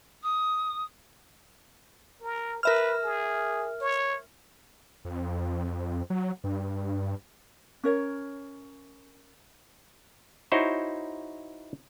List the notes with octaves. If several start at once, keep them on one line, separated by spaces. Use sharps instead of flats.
D#6
A#4
A#4 B4 E5 F6
G#4
C#5
F2
F#3
G2
C#4 A#4 C#5
D#4 E4 F#4 C5 C#5